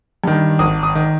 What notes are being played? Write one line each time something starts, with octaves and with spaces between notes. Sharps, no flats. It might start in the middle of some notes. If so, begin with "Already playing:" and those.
G2 D#3
G#1 D#6
D#6
D#3